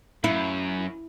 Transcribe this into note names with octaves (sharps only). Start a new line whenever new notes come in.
F#2 E4